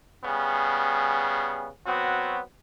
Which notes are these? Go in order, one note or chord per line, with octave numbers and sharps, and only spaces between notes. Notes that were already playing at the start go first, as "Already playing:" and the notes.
C#3 G3 B3 G#4
F#3 B3 C4 F#4